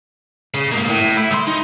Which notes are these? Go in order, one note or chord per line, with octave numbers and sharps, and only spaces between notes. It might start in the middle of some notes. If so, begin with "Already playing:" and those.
C#3
G#2 A#3
A2
E4
C#2 C6
D#4